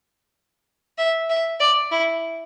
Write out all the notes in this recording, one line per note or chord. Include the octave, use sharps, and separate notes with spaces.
E5
E5
D5
E4